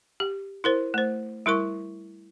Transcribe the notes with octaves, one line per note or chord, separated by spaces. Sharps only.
G4
E4 A#4 C5
A3 C5
G3 E4 A#4 C#6